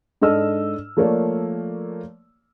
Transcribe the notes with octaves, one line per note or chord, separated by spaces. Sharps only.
G#2 D4 A4 D#5 E6 F6
F3 A3 A#3 C#5 D5